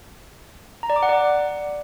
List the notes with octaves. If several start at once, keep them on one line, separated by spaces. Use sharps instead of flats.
A#5
D5
D6
F#5
D5